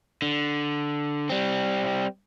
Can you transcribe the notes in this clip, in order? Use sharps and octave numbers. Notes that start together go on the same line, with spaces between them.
D3
G3 C4